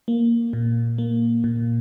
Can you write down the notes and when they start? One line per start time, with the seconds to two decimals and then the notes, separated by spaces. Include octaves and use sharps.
0.08 A#3
0.53 A#2
0.98 A#3
1.44 A#2